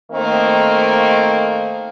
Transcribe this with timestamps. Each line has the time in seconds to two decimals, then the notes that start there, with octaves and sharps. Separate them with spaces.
0.12 D#3 A3 A#3 C4